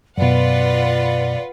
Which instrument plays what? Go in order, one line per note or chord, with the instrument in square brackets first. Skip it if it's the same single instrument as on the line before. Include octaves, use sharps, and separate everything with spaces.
[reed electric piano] F#2 B2 [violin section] F4 B4 F#5 [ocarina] D5